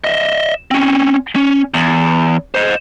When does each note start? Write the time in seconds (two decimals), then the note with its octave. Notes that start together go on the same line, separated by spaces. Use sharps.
0.04 D#5 E5
0.71 C4 C#4
1.36 C#4
1.74 E2
2.55 C5 D#5